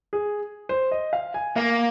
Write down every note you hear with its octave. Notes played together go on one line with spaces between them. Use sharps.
G#4
C5
D#5
F5
G#5
A#3 F5